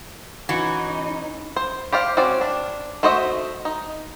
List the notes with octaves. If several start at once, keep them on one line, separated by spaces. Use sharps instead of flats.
E3 C#4 D#4 F#4
C5
G4 C5 D5 F5
C4 C#4 F#4 D5
D4
A3 F#4 C5 D#5 E5
D#4